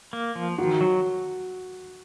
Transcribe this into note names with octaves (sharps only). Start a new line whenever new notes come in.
A#3
F3
D#3 F#4
F#3